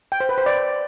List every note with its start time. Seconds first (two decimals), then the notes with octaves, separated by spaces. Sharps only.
0.12 G5
0.20 C5
0.29 B4
0.38 C5
0.46 D5